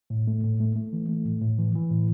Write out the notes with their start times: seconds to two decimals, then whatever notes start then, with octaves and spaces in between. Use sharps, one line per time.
0.10 A2
0.27 A3
0.44 A2
0.60 A3
0.75 A3
0.93 E3
1.09 A3
1.25 A2
1.41 A2
1.58 E3
1.75 E3
1.91 A2